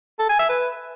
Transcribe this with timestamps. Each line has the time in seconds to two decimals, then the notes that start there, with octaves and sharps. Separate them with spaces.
0.19 A4
0.29 G#5
0.39 E5
0.49 B4